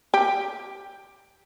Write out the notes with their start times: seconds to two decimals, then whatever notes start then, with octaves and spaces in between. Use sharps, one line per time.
0.14 G4